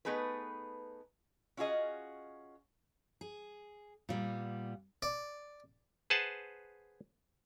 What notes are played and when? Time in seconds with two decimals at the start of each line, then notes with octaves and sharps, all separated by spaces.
0.05 A3 B3 D#4 G#4 B4
1.57 C#4 F4 F#4 G#4 D#5
3.21 G#4
4.09 A#2 G3 B3
5.02 D5
6.10 G#4 B4 C5 F#5 A5